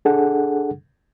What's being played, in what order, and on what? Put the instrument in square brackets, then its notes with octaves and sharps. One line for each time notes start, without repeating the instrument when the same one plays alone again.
[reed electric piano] D4 G#4 A4 F#5